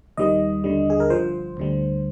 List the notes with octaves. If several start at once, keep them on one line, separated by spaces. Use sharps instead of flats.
D#2 D#3 G3 D#5
D#2 D3 G3
G#4
A#4
G1 G2 F3 C5
D2 D3 G3